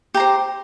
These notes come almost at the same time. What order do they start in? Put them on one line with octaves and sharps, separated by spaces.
G4 A#5 C5